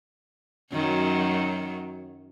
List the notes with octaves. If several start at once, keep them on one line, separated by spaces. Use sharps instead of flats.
F#2 D#3 F#3